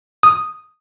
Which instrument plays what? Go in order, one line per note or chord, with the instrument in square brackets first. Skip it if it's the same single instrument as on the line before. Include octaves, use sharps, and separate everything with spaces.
[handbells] D#6